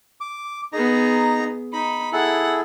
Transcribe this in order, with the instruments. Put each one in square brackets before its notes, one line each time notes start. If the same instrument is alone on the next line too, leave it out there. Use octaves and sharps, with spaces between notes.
[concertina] D6
[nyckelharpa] B3 G#4 [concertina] D#4 A#5
[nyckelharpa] D#4 [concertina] B5
[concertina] E4 G#4 A4 [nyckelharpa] F#5